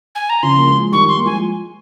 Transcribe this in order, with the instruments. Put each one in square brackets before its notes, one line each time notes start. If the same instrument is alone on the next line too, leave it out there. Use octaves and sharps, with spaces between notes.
[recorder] G#5
A#5
[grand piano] C#3 F3 [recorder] C6
[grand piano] A#3
F3 G#3
[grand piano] D#3 G3 [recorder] C#6
[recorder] C6
[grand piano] A#3
[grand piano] F3 G#3 [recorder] G#5